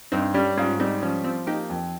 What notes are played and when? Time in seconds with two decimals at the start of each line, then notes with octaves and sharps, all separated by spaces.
0.12 G2 C4 D#4
0.34 G3 C#4
0.57 G#2 C#4 F4
0.80 G3 C4 D#4
1.03 F3 C#4
1.24 F3 C4
1.47 A#3 D#4 G4
1.70 F2